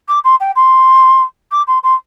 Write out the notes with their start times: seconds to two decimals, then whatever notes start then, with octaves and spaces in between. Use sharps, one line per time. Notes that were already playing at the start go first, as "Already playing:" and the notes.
0.08 D6
0.24 C6
0.40 G5
0.56 C6
1.52 D6
1.67 C6
1.83 C6